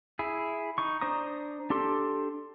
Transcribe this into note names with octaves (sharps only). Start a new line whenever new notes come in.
E4 G#4
D#4 C#6
D4 C5 A#5 D#6
D4 G4 A4 C6